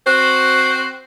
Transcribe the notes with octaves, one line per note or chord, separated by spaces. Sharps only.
C4 F#4 C5